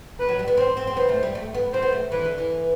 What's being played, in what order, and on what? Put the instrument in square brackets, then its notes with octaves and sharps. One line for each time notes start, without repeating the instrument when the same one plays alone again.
[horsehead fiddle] B4
[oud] F#3
G3
B3
[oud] C4 [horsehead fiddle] C5
[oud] C4
C4
[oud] B3 [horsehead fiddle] C5
[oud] A3
G3
A3
B3
[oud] C4 [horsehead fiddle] C5
[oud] B3
A3
[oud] E3 [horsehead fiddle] B4
[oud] D3
E3